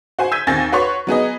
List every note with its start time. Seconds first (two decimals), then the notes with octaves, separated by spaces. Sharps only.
0.19 F#4 C5 G#5
0.32 E6 G6 G#6 B6 D#7
0.47 D#2 C4 G#5 A6 A#6
0.72 F#4 B4 C#5 C6 C#6
1.07 F#3 B3 G#4 D#5